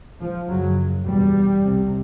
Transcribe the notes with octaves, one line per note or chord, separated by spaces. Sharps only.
F3
F#2 C#3 F#3
E2 B2 G3
C2 C3